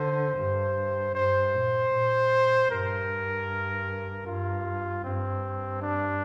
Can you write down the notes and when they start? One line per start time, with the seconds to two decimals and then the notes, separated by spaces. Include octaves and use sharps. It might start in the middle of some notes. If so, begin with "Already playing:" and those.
Already playing: D3 C5
0.38 G2
1.15 G2 C5
1.54 A#2
1.93 A#2
2.70 G2 A#4
4.26 G2 F4
5.04 G2 C4
5.82 D4